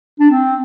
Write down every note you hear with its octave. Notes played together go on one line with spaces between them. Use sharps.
D4
C4